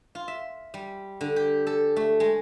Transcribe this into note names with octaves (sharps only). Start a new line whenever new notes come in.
F4
E5
G3
D3
G4
A4
A3
G#3